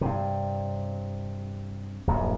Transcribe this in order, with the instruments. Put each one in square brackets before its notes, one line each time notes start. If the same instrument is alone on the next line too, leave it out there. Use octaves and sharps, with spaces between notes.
[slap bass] G2 C3
D1 A#1 F#2